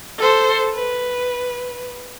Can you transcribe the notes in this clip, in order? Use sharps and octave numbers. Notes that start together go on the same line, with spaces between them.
A4 C5
B4